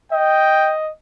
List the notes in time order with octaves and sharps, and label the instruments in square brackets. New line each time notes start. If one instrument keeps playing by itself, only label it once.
[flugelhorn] D#5 [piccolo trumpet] G5